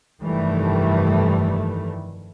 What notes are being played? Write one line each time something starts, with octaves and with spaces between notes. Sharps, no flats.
F1 G2 D#3 E3 G3 A3